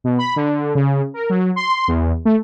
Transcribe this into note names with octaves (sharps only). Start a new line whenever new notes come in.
B2
B5
D3
C#3
A#4
F#3
C6
E2
A3